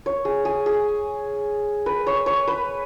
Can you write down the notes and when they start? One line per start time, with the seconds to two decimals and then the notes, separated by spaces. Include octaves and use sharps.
0.06 C#5
0.25 G#4
0.45 G#4
0.66 G#4
1.86 B4
2.07 C#5
2.26 C#5
2.48 B4